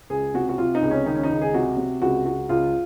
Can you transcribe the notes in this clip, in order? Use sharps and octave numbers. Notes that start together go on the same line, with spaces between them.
C#2 G#4
C3 F#4
F#4
C3 F4
D#4
C#2
C#4
D#3 D#4
C#4
D#4
C#2
G#4
C3 F#4
C3
C#2 F#4
C#2 F#4
C#2 F4